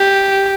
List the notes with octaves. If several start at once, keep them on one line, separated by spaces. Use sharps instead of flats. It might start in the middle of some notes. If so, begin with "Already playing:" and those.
Already playing: G4